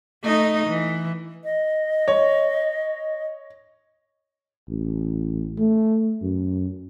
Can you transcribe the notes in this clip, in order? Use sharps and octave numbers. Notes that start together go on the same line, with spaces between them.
A3 D#4 D#5
E3
D#5
C#5
A1
A3
F#2